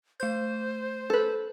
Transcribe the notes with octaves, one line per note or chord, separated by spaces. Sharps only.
A3 C5 G6
A4 B4